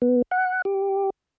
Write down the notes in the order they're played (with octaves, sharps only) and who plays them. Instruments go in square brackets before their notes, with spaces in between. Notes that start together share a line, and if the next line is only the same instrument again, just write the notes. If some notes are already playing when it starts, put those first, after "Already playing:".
[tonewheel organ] B3
F#5
G4